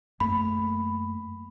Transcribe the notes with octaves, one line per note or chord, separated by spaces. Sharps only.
F#2 A3 A#3 B5